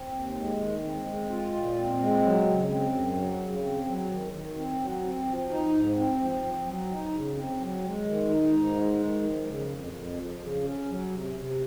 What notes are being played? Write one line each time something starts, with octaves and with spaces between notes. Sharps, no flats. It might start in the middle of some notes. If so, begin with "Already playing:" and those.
Already playing: C4
D#2
G#3
D#3
C4
G#3
F4
A#2
C4
G#3
F#3
C#3
C4
F#2
F#3
C#3
C4
F#3
D#3
D#3
C4
F#3
C4
F3
D#4
G#2
C4
F3
C4
F#3
D#4
C#3
C4
F#3
G#3
D#3
D#4
G#2
G#3
D#3
F3
C#3
F2
F2
F3
C#3
C#4
F#3
C3
C3